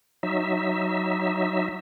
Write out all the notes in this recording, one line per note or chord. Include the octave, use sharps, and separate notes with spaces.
F#3 D#4 E5